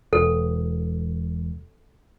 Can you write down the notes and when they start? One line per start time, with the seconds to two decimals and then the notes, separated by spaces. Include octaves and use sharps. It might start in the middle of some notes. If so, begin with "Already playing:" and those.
0.13 E1 A4